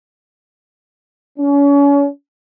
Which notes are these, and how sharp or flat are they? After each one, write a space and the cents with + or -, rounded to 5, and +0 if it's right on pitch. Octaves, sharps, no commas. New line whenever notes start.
C#4 +35